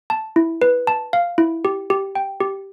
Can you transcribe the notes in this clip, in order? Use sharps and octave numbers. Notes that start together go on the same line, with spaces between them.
A5
E4
B4
A5
F5
E4
G4
G4
G5
G4